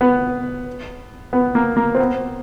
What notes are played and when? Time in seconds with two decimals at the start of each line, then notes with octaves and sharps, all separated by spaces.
0.01 B3
1.33 B3
1.55 A#3
1.77 A#3
1.95 C4
1.99 B3